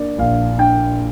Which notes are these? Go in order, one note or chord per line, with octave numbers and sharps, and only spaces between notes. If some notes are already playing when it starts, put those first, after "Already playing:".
Already playing: A#3 D4 D5
A#1 F5
D4 G5